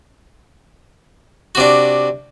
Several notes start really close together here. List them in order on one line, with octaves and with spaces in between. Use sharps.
F#4 C3 D4